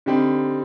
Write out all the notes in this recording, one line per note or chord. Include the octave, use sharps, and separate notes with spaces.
D3 G3 C4 D#4